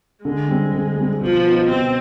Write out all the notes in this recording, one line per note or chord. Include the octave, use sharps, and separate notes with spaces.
D3 G#3
G3 C4
D3
G3 C4
B2 F3
B3 D#4
B2 C4